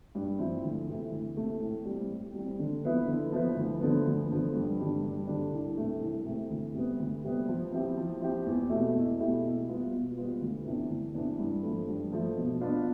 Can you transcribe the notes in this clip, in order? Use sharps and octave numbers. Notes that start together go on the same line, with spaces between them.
G2
F3 C4 E4
D2
C3 E3 A3
D2
C3 E3 A3
A2
G3 C4
A2
G3 C4
D3
F3 B3 E4 B4
D3
F3 B3 E4 B4
D2
D3 F3 B3
D2
D3 F3 B3
G2
D3 G3 D4
G2
D3 G3 D4
C2
C3 E3 A3
C2
C3 E3 A3
D2
C3 G3 B3
D2
C3 G3 B3
F3
C4 E4 G4
F3
C4 E4 G4
E2
B2 A3 E4 G4
E2
B2 A3 E4 G4
B2
G3 B3 F4
B2
G3 B3 F4
D2
C3 E3 B3 D4
D2
C3 E3 B3 D4
G2
F3 A3
G2
F3 A3
B2
B3 D4 F4 B4